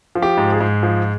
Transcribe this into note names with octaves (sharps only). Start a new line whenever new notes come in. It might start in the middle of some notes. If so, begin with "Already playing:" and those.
F3
G4
G#2
G#4
G#2
F3